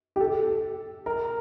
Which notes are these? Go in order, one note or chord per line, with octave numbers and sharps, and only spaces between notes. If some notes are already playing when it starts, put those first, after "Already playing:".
G4
A4
A#4